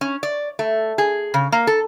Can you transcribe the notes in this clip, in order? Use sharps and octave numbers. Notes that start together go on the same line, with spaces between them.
C#4
D5
A3
G#4
C#3
A#3
A4